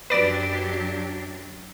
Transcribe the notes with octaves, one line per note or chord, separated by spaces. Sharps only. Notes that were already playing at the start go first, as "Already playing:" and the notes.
F#2 F#3 D4 G4 B4 D5 E7